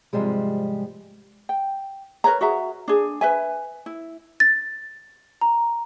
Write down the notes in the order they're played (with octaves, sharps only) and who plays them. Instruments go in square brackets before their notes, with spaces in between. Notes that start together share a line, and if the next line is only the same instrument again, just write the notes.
[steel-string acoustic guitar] G#2 C3 F3 G3 G#3
[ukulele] G5
A#4 B4 C#5 A#5
F#4 G#4 E5 A#5
D4 G#4
B4 E5 G#5
E4
[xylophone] A6
A#5